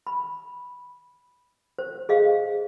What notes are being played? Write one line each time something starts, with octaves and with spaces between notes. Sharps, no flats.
B5
C5
G#4 D#5 F5